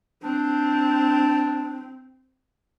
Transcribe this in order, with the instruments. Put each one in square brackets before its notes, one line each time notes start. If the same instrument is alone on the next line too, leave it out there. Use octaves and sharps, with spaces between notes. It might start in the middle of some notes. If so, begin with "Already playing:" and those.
[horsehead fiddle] C4 [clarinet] D4